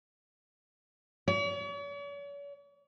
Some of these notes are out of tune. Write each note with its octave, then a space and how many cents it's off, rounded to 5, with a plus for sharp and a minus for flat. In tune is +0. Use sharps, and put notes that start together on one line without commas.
C#5 +45